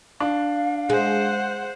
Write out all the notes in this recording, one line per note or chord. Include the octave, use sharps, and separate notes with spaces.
D4 F5
G#3 C5 F#5